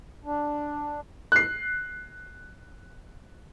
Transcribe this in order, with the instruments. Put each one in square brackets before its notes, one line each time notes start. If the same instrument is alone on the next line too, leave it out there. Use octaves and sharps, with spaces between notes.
[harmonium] D4
[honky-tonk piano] F#6 C7